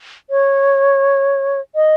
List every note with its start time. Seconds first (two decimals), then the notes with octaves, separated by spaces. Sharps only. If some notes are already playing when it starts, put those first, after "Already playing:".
0.30 C#5
1.75 D#5